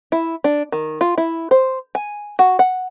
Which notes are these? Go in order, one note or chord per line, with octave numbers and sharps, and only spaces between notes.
E4
D4
D#3
F4
E4
C5
G#5
F#4
F#5